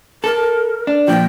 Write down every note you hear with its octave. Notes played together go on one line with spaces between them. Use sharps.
A4 A#4
D4
A#2 F3 G5